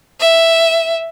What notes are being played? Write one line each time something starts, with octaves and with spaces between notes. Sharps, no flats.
E5